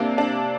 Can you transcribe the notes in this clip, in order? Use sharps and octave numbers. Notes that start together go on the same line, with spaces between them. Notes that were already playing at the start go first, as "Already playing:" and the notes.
Already playing: C3 A#3 D4
D4